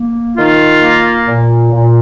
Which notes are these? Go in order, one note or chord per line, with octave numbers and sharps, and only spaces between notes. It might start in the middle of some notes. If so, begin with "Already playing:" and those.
Already playing: A#3
D#3 F4
A#3
A#2
A#2